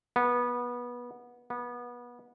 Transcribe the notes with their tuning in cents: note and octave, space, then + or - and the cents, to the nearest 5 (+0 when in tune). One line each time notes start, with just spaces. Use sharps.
B3 -20
B3 -25